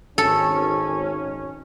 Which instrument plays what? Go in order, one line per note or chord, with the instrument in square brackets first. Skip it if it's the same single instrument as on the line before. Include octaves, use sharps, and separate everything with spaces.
[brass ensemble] G#1 C#4 [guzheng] A4